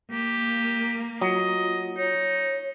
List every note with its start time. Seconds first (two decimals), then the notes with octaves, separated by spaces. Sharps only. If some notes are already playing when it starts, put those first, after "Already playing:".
0.11 A#3 G4
1.21 F#3 F4 D#5
1.97 D#4 C#5